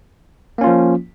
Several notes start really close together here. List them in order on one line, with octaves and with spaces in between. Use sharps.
A#3 C#4 F4 F3